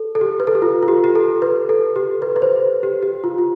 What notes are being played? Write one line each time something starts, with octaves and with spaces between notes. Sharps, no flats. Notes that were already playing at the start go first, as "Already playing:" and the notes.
Already playing: A4
A4
G4
B4
A4
G4
F4
F4
G4
G4
A4
B4
A4
G4
B4
B4
C5
G4
G4
F4
F4